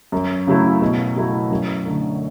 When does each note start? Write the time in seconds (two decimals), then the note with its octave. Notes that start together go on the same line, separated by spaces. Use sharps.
0.12 F#2
0.47 C#3 F#3 A3 E4
0.82 B2
1.16 F#3 A3 E4
1.51 F#2
1.85 D3 A3